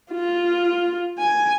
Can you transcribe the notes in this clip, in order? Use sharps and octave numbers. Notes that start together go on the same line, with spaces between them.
F4
G#5